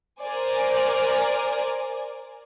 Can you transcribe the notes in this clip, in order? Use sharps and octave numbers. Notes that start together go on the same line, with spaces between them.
A#4 C5 D5 G#5